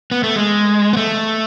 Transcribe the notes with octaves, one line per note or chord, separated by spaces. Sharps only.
B3
A3
G#3
B3
A3